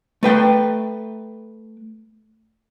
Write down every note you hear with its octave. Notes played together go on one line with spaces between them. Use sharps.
A3 B4 G5